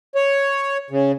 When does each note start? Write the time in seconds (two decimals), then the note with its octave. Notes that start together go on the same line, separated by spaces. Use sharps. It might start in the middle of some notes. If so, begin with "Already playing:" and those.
0.15 C#5
0.91 C#3